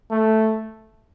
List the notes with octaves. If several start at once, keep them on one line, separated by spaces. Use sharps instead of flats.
A3